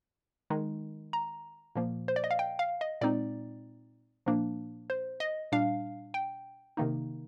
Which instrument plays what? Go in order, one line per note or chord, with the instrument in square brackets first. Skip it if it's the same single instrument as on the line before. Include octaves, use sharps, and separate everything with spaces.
[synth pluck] D#3 G#3 D#4
A#5
A#2 F3 A#3
C5
D5
D#5
F5
G5
F5
D#5
A#2 G#3 C4 D#4 D5
A#2 F3 A#3 D4
C5
D#5
A#2 G3 D4 F5
G5
C3 D#3 A#3 D#4